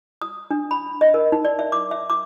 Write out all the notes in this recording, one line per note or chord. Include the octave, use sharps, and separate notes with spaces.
D#6
D4
B5
D#5
A#4
D#4
D5
E5
D6
E5
D6